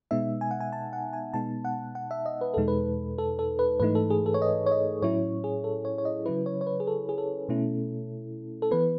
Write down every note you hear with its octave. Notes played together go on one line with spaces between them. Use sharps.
B2 G#3 B3 D#4 E5
G#5
F#5
G#5
A5
F#5
G#5
B2 G#3 B3 D#4 A5
F#5
F#5
E5
D#5
B4
E2 B2 G#3 D#4 A4
B4
A4
A4
B4
G#2 E3 A3 D#4 B4
A4
G#4
A4
C#5
D#5
C#5
D#5
A2 F#3 C#4 E4 C#5
G#4
A4
C#5
C#5
D#5
C#3 F#3 C#4 E4 B4
C#5
C#5
B4
G#4
A4
G#4
A4
B2 A3 C#4 E4
A4
E3 B3 B4